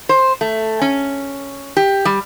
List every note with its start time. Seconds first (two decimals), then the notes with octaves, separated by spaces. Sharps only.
0.09 C5
0.41 A3
0.81 C#4
1.77 G4
2.05 G3